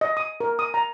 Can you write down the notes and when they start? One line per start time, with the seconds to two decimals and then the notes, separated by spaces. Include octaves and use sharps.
0.01 D#5
0.17 D#6
0.40 A#4
0.59 D#6
0.74 A#5